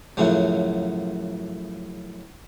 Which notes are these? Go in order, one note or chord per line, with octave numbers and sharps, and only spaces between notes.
F#2 A2 C#3 F3 F#3